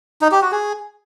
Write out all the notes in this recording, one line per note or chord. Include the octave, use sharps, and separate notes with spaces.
D#4
G4
F#4
G#4